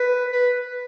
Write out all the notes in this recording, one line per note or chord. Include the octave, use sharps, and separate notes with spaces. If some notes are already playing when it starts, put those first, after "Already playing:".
Already playing: B4
B4